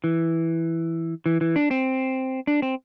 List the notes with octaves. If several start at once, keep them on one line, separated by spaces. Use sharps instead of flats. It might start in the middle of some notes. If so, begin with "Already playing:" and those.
E3
E3
E3
D4
C4
D4
C4